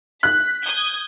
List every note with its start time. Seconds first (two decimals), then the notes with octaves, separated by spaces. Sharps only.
0.23 F#6 B6
0.65 D#6 G6 G#6